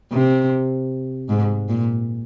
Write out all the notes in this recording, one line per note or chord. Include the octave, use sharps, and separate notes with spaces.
C3
G#2
A#2